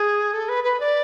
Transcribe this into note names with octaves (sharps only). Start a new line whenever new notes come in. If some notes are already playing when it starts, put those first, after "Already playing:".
Already playing: G#4
A4
B4
B4
D5